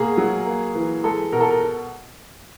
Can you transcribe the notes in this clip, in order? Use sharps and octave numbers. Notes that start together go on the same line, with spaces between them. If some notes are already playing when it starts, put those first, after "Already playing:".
Already playing: B2 A#3 G#4
F#3
A#3
E3
G#3 A4
B2 A#4
A4
A#4